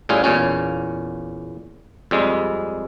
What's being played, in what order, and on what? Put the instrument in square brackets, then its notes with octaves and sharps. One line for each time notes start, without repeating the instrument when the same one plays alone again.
[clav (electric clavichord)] A2 G3 C#4 F4 G#4
E2 A#2 C#4
F2 G3 G#3